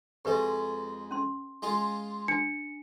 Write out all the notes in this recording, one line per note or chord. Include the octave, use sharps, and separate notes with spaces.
F2 G#3 G4 B4 D#5
C#4 C6
G#3 F4
D4 G#5 C#7